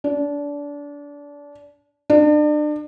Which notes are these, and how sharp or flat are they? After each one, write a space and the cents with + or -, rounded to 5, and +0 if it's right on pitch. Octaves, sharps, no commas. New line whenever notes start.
D4 -25
D4 +35